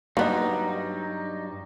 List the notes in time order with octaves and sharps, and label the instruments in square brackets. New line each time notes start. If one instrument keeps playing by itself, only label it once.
[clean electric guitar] G2 F#3 G3 [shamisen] A#3 B3 D#5 [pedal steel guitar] D#4